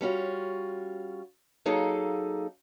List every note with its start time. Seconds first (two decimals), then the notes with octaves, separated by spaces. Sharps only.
0.01 G3 C#4 F4 F#4
1.66 F#3 A#3 D#4 G#4 A4 F5